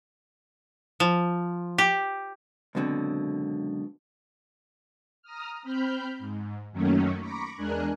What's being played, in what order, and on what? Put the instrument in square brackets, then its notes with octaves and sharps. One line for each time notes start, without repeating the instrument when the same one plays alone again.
[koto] F3
G4
[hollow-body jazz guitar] C#2 F#2 B2 D3 C4
[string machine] A#5 D#6 F6
C4 B5 F6 G6
G#2
F#2 D#3 F#3 A3 A#3 C#4
A#5 B5 C#6 D6
E2 G#3 D4 A#4 G#5 F#6